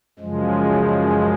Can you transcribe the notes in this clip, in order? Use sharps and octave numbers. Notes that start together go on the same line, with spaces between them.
F#2 C#3 F3 G#3